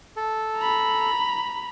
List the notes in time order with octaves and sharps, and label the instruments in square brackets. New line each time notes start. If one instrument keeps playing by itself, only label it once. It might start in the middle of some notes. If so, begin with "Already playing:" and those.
[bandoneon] A4
[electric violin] A#5 B5